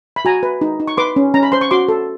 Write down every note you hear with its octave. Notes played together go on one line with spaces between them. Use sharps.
B5
F#4 G#5 A#5
B4
D#4
D#4
C#6
B4 C6 D6
C#4
C#4 A#5
B5
C5 C6
C#6
F#4 C6 D6
A4